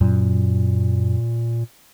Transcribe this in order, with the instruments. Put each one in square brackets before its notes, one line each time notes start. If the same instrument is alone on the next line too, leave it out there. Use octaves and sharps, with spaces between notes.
[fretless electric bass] F#2 [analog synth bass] A#2